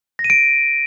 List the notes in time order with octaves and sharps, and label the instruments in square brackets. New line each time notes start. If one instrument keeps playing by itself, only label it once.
[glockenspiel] A#6
D#7
D7